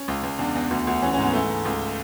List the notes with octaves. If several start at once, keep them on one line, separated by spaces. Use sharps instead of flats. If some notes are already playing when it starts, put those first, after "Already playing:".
Already playing: C#4
C#2
C#2
E2 D4
E2
D2
D2
E3 C#4
C#4
G#2
B3
E3 A3
G#2
C#2